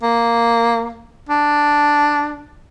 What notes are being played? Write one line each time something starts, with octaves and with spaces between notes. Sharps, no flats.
A#3
D4